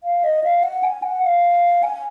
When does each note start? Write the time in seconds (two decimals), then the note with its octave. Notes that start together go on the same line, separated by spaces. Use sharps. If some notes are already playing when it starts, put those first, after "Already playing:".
0.04 F5
0.24 D#5
0.44 F5
0.63 F#5
0.83 G#5
1.03 F#5
1.23 F5
1.83 G#5